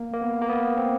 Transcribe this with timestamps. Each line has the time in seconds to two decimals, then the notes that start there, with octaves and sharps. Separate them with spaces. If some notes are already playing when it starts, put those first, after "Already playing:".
Already playing: A#3
0.13 A#3
0.21 B3
0.42 A#3
0.49 B3
0.77 C4